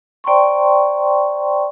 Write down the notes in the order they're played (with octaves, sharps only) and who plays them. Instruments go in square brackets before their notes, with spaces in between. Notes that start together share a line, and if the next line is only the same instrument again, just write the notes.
[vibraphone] C5 D5 G5 A#5 C6 C#6